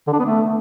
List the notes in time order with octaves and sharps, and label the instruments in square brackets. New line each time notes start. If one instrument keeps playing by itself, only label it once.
[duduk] D3
D4
B3
A3